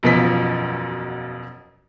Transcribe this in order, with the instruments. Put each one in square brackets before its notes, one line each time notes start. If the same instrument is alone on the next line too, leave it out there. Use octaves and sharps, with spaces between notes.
[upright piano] E1 F#2 B2 F3 B6